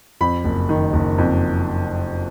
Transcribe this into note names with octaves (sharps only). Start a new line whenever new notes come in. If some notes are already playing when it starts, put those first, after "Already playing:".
F2 B5
F#1
D#3
F#1
F2